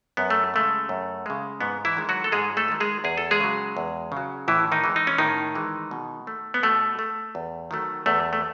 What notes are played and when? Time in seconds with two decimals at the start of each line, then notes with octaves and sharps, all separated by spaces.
0.17 F#2 B3
0.30 A3
0.54 C#3 G#3 A3
0.89 F#2
1.26 C#3 G#3
1.61 G#2 B3
1.85 E3 E4
1.97 D#3 G#3
2.09 F#3 F#4
2.24 A4
2.32 G#2 G#3 G#4
2.57 A3 A4
2.68 D#3 G#3
2.80 G#3 G#4
3.04 E2 G#4
3.18 A4
3.31 G#3 G#4
3.40 C#3 F#3
3.77 E2
4.12 C#3 F#3
4.48 A2 E3 E4
4.72 D#3 D#4
4.84 E3 G#3
4.96 D#4
5.07 C#4
5.18 A2 D#3 D#4
5.55 E3 G#3
5.91 B2
6.27 A3
6.54 B3
6.63 B2 A3
6.99 A3
7.35 E2
7.71 D#3 F#3 A3
8.06 E2 A3
8.33 A3